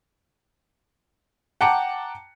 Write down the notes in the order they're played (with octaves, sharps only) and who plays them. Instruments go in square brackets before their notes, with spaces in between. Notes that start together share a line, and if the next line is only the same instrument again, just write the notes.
[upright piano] F#5 G5 A5 A#5 D6 C#7